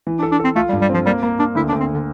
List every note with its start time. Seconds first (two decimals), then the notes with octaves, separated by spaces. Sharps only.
0.07 E3
0.19 D4
0.23 A4
0.32 D4
0.40 C4 A4
0.55 A3 F4
0.69 G3
0.73 G2
0.81 G3
0.89 F3 C4
1.06 G3 A#3
1.23 A#3
1.39 A#3 D4
1.55 D2 E4
1.68 D4
1.72 D2
1.80 C4
1.94 D3